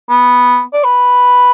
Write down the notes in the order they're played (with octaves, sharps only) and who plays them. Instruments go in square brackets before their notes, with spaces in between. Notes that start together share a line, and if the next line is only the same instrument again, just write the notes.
[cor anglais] B3
D5
B4